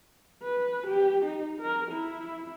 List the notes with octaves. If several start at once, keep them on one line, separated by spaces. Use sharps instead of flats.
B4
G4
D#4
A#4
E4